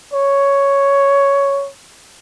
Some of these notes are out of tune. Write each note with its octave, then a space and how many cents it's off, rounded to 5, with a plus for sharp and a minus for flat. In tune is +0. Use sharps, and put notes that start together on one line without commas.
C#5 +5